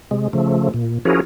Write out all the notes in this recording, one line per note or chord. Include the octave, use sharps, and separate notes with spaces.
C3 G#3
C#3 F3 A3
A#2
F3 C#4 E4 F#4 G#4 A#4